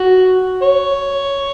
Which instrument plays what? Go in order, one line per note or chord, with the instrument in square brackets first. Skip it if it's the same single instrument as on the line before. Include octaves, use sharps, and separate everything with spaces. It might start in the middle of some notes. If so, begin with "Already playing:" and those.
Already playing: [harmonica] F#4
C#5